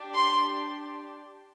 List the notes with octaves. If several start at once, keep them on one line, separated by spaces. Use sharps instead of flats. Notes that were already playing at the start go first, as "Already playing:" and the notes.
Already playing: D4 G4
C6